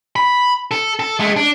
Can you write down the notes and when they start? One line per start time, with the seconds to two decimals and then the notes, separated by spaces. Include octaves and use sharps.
0.16 B5
0.71 A4
0.99 A4
1.19 G#3 A3
1.36 D4